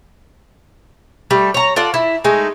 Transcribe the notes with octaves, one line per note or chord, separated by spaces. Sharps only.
G3 A3
C#5 A#5
F4 A4 D5 F#5
E4
G#3 A3 D#4